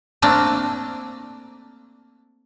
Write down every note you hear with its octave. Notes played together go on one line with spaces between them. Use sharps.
A3 A#3 C4 D4